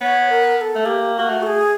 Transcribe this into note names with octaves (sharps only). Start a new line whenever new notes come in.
B3 C#5
A#4
A#4
A4
A3
A#3 G4
G4
A#3 F#4
A3
A4
G#4